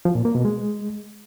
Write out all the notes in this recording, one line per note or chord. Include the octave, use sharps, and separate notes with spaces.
F3
A#2
A#3
B2
G#3